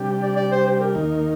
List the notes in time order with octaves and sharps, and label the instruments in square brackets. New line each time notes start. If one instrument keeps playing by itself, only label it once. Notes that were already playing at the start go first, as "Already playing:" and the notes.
Already playing: [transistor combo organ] C3 G3 D4 G4
[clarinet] D5
D5
C5
C5
A#4
[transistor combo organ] D#2 D#3 A#3 D#4